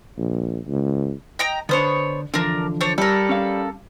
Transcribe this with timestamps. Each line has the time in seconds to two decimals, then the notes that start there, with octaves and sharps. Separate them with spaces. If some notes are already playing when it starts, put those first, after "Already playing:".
0.18 A#1
0.68 C#2
1.39 D#5 G5 A#5
1.69 D3 B3 D4 C5 C#5
2.34 D3 E3 F3 D4 A#4
2.81 D4 C5 C#5
2.98 G3 A4 A#4
3.29 C#4 F5